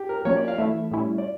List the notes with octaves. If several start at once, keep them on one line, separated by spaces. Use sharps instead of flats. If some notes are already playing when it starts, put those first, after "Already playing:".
Already playing: G4
A#4
A#4
F3 A#3 C#4 C#5
D5
F5
E3 A3 E4 E5
A2 G3 C#4 E4
D5